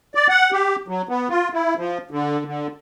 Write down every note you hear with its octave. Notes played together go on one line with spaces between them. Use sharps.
D5
F#5
G4
F#3
B3
F4
E4
F3
D3
D3